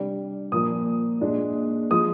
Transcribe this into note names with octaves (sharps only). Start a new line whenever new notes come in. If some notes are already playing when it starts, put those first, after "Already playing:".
Already playing: C3 G3 D4
A#2 F3 A#3 D#6
A#2 G#3 D4
F3 G#3 D#6